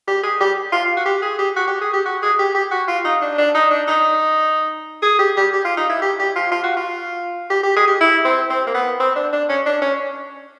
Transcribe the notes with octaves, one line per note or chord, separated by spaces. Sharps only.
G4
G#4
G4
F4
F#4
G4
G#4
G4
F#4
G4
G#4
G4
F#4
G#4
G4
G4
F#4
F4
D#4
D4
D4
D#4
D4
D#4
G#4
G4
G4
G4
F4
D#4
E4
G4
G4
F4
F4
F#4
F4
G4
G4
G#4
G4
E4
C4
C4
A#3
B3
C4
D4
D4
C#4
D4
C#4